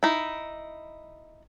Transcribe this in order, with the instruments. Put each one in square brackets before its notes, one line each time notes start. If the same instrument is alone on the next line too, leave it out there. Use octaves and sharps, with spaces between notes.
[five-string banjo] D#4 E4